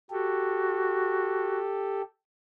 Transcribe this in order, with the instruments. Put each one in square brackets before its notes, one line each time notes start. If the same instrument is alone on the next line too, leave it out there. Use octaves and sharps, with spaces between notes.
[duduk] F#4 [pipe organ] G4 A4